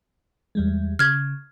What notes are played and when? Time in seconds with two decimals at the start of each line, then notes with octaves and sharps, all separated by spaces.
0.55 E2 G3 G#3
0.99 C#3 F6 G#6